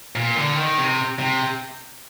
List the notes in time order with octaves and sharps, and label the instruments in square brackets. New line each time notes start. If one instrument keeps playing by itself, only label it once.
[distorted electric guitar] A#2
D3
D#3
C3
C3